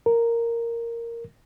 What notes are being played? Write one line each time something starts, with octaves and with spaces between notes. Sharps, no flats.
A#4